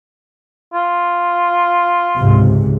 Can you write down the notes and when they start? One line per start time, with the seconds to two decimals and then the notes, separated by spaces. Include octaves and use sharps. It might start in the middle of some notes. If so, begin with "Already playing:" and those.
0.74 F4
2.18 C#2 G#2 C3